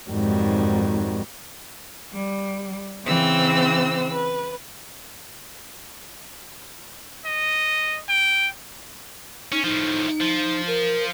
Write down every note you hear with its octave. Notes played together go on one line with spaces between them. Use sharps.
F2 G#2 D#3 F#3 G3
G3
C#3 E3 C4 C5 E6
B4
D#5
G5
C#4 D#4
A2 F3 D#4
F3
A#4